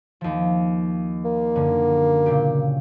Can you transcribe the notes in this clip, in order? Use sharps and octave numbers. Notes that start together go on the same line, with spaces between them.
D#2 F3
A#3
F#2 D3
A#2 C#3 G4